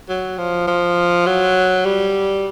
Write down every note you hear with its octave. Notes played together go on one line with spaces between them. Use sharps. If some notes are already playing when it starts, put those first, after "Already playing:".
F#3
F3
F3
F#3
G3